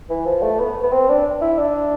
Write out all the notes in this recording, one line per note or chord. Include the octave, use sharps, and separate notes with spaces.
E3
F3
A3
B3
B3
C4
D4
E4
D4